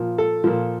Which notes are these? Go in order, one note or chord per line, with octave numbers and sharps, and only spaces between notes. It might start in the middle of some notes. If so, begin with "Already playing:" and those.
Already playing: A#2 F3
A4
A#2 F3